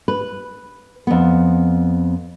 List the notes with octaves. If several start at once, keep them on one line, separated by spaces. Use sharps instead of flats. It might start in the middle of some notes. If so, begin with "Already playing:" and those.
B4
F2 B3